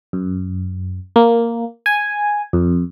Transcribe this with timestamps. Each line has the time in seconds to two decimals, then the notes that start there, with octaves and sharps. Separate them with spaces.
0.13 F#2
1.16 A#3
1.86 G#5
2.53 F2